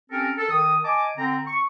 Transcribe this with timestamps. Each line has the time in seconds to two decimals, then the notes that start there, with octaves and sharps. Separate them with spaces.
0.11 C4 C#4 G4 A4 A#4
0.37 A4
0.50 D#3 D#6
0.84 D#5 G#5 A5 D6
1.17 D3 C4 A#5
1.47 C#6